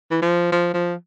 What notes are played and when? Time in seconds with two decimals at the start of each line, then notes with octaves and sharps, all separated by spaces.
0.11 E3
0.22 F3
0.52 F3
0.74 F3